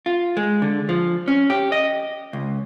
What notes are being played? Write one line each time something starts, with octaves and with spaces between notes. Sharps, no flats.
F4
G#3
D3
F3
C#4
G4
D#5
C#2